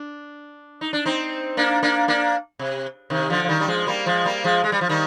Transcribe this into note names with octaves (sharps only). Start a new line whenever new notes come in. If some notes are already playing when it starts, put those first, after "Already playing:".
Already playing: D4
D#4
D4
C4 D#4
A#3 D4
A#3 D4
A#3 D4
C3
C3 D#3
D3 F3
F3
D#3 G3
G3
F3 G#3
G3 A#3
F3 G#3
G3 A#3
F3 G#3
G#3
G3
F3
D#3 G3